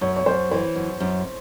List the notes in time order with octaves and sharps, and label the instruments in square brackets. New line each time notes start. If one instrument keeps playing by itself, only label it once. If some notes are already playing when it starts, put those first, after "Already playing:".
[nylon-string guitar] F#2 [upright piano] C#5
[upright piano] C#5
[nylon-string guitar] F#2 [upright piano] C5
[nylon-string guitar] E3 [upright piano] C5
[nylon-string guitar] F#2
F#2